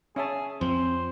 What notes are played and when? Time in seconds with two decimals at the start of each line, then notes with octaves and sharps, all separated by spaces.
0.16 C#4 G#4 E5 A5
0.61 F2 F3 C4 C5